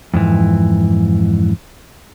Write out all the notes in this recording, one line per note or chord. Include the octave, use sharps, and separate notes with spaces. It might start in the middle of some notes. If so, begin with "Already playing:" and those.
F2 G#2 E3